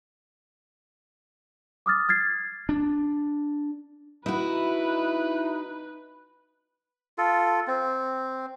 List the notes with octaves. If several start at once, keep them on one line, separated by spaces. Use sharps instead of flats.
D6 D#6 F6 A6
F6 G#6 A6 C7
D4
D#4 E4 F#4 B4
F4 A4
C4